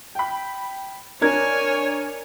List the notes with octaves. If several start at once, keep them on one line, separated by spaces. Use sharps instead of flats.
G5 B5
D4 A#4 C#5 G#5 G#6